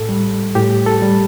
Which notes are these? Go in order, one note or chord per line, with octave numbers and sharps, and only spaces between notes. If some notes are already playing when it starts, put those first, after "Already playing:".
Already playing: A2 A4
G3
A2 G4
A4
G3